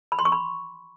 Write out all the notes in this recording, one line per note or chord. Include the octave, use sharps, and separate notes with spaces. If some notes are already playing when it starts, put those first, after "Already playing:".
B5
C6
C#6
B5